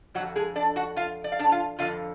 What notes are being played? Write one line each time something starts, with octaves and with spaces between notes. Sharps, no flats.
F2 D3 F#3 F#4
G#3 G#4
D4 D5
F#4 F#5
F4 F5
D5
F5
D4 D5
F4 F5
F2 D3 F4 F5